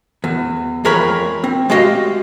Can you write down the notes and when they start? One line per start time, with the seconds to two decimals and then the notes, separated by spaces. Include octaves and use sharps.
0.24 E2
0.85 F2 G#3 A#4 C#5 B5
1.44 C4
1.70 G#3 F#4 G4 D#5 F5